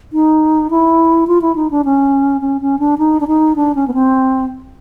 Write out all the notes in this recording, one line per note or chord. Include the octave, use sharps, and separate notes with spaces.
D#4
E4
F4
E4
D#4
D4
C#4
C#4
C#4
D4
D#4
D4
D#4
D4
C#4
B3
C4